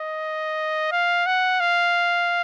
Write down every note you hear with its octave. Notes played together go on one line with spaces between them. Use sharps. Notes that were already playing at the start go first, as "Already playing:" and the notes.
Already playing: D#5
F5
F#5
F5